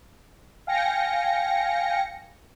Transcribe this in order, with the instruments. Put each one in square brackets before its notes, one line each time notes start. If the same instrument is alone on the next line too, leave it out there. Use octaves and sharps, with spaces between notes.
[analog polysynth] F5 G5 G#5 A#6 C#7